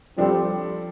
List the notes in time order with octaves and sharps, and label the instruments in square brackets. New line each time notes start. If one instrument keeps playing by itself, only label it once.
[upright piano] F3 D4 A4 [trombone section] G3 C4